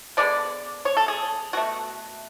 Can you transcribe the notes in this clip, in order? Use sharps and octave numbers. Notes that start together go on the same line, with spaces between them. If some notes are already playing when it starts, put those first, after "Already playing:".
D3 G#3 B3 D5
C#5
A4
G#4
B2 A3 F#4